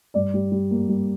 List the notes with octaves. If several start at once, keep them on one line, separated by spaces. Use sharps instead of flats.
G2 D5
G3
G3
A#3
G3